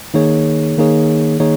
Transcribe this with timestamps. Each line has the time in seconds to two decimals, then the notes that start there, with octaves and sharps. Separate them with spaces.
0.14 D#3 A#3 D#4 G#4 C#5
0.77 D#3 A#3 D#4 G#4 C#5
1.40 D#3 A#3 D#4 G#4 C#5